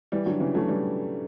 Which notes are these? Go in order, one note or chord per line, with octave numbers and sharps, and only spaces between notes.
E3 G3
D3 F#3
C#3 E3
F#3 A3
E3 G3